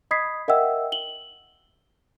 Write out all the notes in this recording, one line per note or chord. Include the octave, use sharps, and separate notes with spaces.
D#5 B5 D#6 G#6 B6 C7
A#4 D#5 E5 F#5 G5 E6
F#7 G7